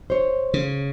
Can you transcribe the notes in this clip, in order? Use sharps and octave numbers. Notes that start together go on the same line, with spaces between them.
C5 C#5
C#3